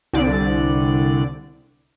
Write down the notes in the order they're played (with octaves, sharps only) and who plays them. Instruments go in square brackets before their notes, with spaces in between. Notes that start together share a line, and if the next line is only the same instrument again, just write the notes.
[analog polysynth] C2 D3 D5